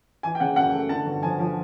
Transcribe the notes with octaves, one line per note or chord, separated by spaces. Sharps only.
E3 G#5
G5
C#3 F#5
F#2 F#5
A3
D3 A5
G1
F3 G#5
F3